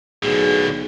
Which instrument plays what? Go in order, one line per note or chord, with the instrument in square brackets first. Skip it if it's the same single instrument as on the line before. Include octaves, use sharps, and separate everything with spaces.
[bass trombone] B1 [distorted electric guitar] A2 D3 [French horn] G#4